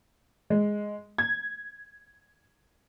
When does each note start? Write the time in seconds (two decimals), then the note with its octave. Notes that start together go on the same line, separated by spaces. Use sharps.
0.50 G#3
1.18 G#6